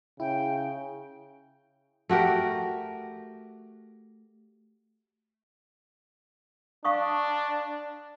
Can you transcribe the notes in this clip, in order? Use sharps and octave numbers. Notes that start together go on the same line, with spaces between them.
C#3 E4 G5
A3 F#4 G4 A#4
D4 F5 C#6 D#6